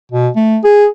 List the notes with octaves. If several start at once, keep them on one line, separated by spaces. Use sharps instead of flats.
B2
A3
G#4